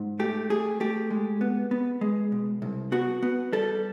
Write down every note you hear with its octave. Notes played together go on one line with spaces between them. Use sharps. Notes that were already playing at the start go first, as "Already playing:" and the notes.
Already playing: G#2
A3 G4
A3 G#4
A3 G4
G#3
B3
B3
G#3
B2
C2
B3 F#4
B3
G3 A4